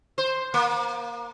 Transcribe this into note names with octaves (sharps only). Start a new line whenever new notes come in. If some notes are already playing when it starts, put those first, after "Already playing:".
C5
A#3